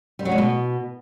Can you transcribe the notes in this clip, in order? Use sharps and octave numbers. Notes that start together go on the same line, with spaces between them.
G3
F#3
G#3
B2